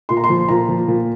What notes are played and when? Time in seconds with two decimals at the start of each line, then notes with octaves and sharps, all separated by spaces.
0.09 A#2 C6
0.17 A#5
0.24 C6
0.30 F3
0.49 A#2 A#5
0.69 F3
0.88 A#2